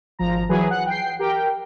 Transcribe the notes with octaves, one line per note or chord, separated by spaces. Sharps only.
G#1 F3 A#5
E3 F#3 G#4 B4
F#5 F#6
G5 C7
G4 A#4 G5